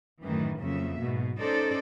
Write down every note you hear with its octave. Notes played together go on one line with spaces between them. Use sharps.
F#2 A2 D#3 E3
F2 C#3 F#3 A#3 E5
G#2 B2
C#4 D#4 A4 C5 D5